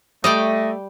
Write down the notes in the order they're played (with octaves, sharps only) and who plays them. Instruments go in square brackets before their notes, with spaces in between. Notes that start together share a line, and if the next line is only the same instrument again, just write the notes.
[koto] G3 D5 G5 [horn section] A3 [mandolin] D#5